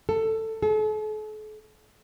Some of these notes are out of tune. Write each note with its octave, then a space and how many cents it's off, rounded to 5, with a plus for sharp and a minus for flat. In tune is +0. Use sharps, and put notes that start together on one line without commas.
A4 +15
A4 -45